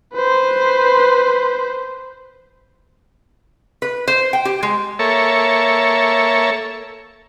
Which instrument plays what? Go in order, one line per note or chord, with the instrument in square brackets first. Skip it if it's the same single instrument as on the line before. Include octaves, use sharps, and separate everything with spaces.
[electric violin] B4 C5
[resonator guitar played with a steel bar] B4
C5
G5
G4
G#3
[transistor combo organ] A#3 A4 C#5 E5